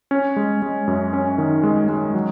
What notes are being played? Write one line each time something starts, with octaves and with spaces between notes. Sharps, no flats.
C#4
G#3
G#3
F#2
C#4
D#3
G#3
G#3
F#3